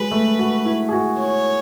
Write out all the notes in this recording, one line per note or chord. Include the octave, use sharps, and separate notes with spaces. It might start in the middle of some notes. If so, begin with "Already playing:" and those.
Already playing: F#3 G#3 B4
A3
F#4
E4
G#4
F#4
C#5